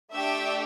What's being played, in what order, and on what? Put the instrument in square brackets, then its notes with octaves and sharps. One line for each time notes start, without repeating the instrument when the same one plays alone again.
[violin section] A3 D4 G4 E5 G5